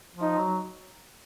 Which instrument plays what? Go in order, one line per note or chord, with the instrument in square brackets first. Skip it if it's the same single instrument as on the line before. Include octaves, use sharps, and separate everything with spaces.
[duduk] F3
[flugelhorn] D#4
[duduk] F#3